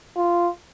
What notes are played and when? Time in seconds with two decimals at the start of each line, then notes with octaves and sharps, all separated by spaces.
0.16 F4